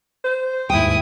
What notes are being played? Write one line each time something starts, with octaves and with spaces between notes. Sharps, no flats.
C5
D#2 G#2 E4 G5 D#6